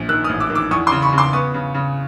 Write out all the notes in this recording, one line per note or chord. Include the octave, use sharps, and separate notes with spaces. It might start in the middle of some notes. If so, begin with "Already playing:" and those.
Already playing: A#1
D#3 E6 F#6
D#6 F6
A1
D6 E6
D#3
D6 E6
E2 C#6 D#6
C6 D6
C#3
B5 C#6
C#3
C6 D6
B3 C#6 D#6
C#3
C#3